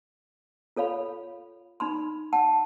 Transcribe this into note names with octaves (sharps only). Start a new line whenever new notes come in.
F4 A4 C#5 F5 B5
D#4 B5 C6
F#5 A5